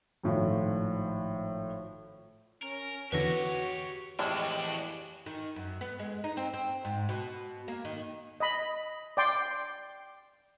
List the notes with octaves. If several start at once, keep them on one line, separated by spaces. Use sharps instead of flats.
G#1 A2 F3
C#4 A#4
E2 D3 E3 F#4 G4 B4 C#5 A#6
F2 A2 E3 G3 G#3 D4 F#4 G4
D#3
F#2
B3
G#3
D#4
C4
C4
G#2
B2
A#3
D#3
D#5 B5
D5 G5 C6